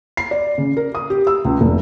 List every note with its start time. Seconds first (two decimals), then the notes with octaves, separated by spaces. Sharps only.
0.17 C7
0.31 D5
0.58 C#3
0.77 A#4
0.95 D#6
1.10 G4
1.27 E6
1.45 C#2
1.61 F1